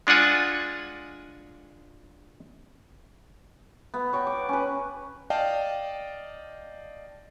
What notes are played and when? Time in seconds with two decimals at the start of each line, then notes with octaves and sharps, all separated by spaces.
0.07 G#3 D4 F4 F#5 G#5
3.94 B3
4.13 C#5 F#5 G5 A#5
4.27 D6
4.49 C#4 B4
5.30 D5 D#5 F5 G5 A5